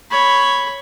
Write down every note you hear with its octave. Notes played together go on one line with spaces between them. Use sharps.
C#5 B5